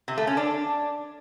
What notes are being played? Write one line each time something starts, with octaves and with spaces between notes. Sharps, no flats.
C3
A3
C#4
D4